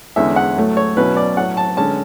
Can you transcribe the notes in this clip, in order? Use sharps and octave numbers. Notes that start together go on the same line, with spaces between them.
E2 D3 G#3 C#4 E4 E5
F#5
A2 F#3 A3
C#5
B2 F#3 C#4 E4 B4
D5
A2 F#3 A3 F#5
A5
D3 G#3 C#4 A5